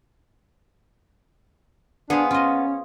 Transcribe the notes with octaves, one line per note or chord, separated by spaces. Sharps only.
B3 D4 G#4 C5 F5
C#4 F4 D#5